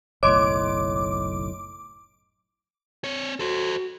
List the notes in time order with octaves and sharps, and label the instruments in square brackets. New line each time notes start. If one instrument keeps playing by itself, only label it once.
[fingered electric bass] F#1 B1 A2 [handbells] C#5 D#5 C6 [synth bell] D6
[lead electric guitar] C4 C#5
[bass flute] F#4 [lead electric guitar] A4 C5